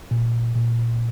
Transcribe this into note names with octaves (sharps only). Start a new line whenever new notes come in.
A#2
A#2